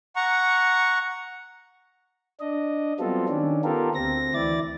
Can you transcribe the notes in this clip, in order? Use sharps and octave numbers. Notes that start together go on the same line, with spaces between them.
F#5 A#5 C#6
D4 D#5
F#3 G3 B3 C4 F4 A4
D#3 C#4 D4
B3 F4 G4 A4 A#4
D2 C4 A#6
D2 E3 E4 D5 A6